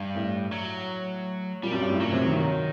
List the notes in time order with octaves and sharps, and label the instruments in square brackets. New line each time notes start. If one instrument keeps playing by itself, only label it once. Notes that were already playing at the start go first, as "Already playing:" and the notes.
Already playing: [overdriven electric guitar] G2
[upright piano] A2
[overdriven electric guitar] F#3
[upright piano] A#2 [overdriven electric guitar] G3
[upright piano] F#2
G2
A2
[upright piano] A#2 [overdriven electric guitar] F#3
[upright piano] C3
D#3
[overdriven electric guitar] D#3 [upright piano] F#3